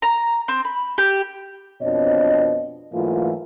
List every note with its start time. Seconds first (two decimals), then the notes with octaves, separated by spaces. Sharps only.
0.02 A#5
0.48 C4
0.65 B5
0.98 G4
1.82 F2 B2 C4 D4 C#5 D#5
2.93 G#2 E3 F#3 A3 A#3 F4